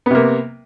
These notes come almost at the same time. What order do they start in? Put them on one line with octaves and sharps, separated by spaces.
B3 C3 A#3